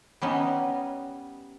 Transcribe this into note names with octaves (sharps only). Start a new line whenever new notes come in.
G3 B3 C#4 D#4